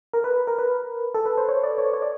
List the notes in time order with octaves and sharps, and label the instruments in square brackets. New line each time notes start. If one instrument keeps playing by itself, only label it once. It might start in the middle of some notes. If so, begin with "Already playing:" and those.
[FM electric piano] A#4
B4
A#4
B4
A4
B4
C5
C#5
D5
C#5
C#5
D5